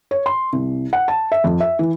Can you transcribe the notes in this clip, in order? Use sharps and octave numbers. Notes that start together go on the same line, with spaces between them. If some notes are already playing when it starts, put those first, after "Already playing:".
C#5
C6
C2
F#5
A5
E5
F2
E5
E3